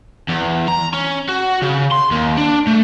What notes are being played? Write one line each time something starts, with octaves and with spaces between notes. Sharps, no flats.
E2
A#5
C#4
F#4
C#3
C6
D#2
D4
A3